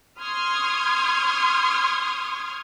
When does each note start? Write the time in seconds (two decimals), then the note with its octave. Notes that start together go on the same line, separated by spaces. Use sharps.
0.21 C6 C#6 D#6 F6 G#6